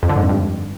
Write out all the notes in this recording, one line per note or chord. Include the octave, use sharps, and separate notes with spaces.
F2
D3
G#2
F2
G2